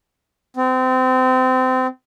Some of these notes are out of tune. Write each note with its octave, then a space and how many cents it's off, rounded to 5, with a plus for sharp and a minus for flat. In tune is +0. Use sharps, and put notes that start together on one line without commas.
C4 -25